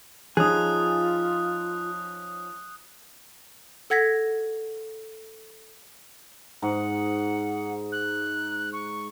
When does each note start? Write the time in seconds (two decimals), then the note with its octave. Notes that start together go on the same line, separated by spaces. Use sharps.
0.37 F3 C#4 D#4 F4 G#4 D#6 F#6
3.90 A4 F#5 G#6 A#6 B6
6.62 G#2 F#5
7.92 F#6
8.73 C#6